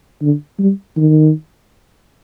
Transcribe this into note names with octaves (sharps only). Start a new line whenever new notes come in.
D3
G3
D#3